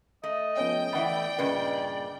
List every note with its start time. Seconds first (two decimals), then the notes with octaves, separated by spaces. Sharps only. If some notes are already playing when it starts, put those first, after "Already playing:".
0.23 A3 D#5
0.57 F3 B3 C#4 G5
0.92 E3 A3 E4 D5 F#5 B5
1.38 G2 A#2 C#3 B4 D#5